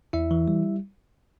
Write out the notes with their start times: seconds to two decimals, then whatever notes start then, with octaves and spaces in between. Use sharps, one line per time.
0.13 E2 E4 E5
0.31 E3
0.48 G3